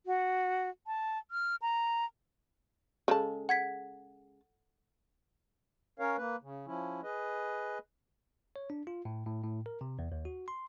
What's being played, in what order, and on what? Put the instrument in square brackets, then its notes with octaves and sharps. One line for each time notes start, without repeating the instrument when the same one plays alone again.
[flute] F#4
A5
F6
A#5
[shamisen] C#3 G#3 A5 [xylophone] A4
[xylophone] F#5 G#6 B6
[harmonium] C#4 A#4 C#5 F5
A#3 B4
C#3
F3 C#4 E4
G#4 B4 D#5
[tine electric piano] C#5
D4
F4
A2
A2
A2
A#4
C3
E2
D#2
F#4
C6